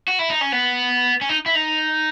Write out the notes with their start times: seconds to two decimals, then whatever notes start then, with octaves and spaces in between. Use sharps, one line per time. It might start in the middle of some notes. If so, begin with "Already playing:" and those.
0.08 F#4
0.19 E4
0.30 D#4
0.41 C#4
0.52 B3
1.21 C#4
1.29 D#4
1.46 E4
1.55 D#4